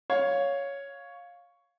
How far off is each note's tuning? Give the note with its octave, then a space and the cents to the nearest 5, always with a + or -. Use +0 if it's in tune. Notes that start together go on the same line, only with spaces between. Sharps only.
C#5 +5 F5 +10